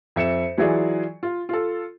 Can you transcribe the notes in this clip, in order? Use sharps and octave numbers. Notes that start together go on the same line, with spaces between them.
F2 E5 C#7 E7
E3 F#3 E4 F4 G#4 D5
F4
F4 A4